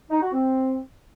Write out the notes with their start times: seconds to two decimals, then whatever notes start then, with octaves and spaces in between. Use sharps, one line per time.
0.10 D#4
0.21 F#4
0.33 C4